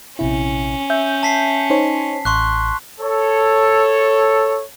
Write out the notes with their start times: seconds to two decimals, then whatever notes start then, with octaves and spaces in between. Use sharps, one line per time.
0.19 A#1 C3 C#4 E4
0.90 E5 G6
1.23 A5 B6 C7
1.70 D#4 C5 C#5
2.25 A1 C6 C#6 F#6
3.00 A4 C#5